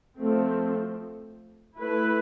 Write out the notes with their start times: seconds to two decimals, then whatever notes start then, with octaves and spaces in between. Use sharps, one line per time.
0.17 F3 A3 C4
1.78 A3 E4 B4